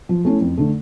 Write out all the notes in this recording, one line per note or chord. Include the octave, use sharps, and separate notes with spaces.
F3
A3 C#4 E4
F2
D3 A3